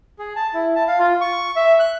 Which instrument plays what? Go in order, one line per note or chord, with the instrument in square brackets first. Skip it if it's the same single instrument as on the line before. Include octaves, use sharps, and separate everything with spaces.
[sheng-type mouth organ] G#4
A5
E4
A5
F5
F4
C#6
E5
F#6